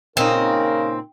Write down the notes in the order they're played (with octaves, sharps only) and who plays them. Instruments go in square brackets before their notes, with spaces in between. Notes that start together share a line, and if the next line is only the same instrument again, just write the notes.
[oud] A#2 D#4 [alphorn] C#3 [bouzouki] C4 [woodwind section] A#4